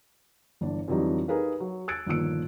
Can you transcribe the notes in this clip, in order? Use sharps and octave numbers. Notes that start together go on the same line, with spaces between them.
G1 E3 D4
F2 D3 E3 F#3 G3 D#4
D#4 G4 G#4 A#4 B4 F5
F#3
E6 F#6 G#6 A6 D7
G1 A#2 D#3 F3 E6 D7